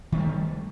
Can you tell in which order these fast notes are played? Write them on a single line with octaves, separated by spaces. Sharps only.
D#3 B3 G3 A3